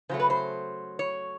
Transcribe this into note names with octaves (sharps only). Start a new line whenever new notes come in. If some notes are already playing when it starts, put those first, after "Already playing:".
C#3 F#3 A3 C5
B4
C5
C#5